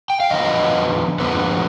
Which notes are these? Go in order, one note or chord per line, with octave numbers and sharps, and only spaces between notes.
G5
F5
F2 D3 F3 B3 D#5
F2 D3 F3 B3